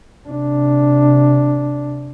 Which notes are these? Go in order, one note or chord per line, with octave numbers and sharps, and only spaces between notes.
C3 D4